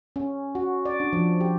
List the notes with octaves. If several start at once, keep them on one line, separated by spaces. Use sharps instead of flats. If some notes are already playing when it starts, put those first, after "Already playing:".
C#4
F#4
D5
D4
F3
G4